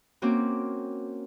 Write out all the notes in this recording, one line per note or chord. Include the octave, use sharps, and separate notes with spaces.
A#3 C4 C#4 F#4 D6